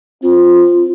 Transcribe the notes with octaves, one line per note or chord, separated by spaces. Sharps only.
C4 F4